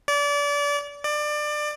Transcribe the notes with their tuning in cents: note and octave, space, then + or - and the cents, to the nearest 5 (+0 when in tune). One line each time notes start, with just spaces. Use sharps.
D5 -30
D5 +25